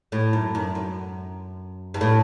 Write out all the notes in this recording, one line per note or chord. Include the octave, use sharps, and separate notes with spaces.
A2
F#2
F#2
F#2
G2
A2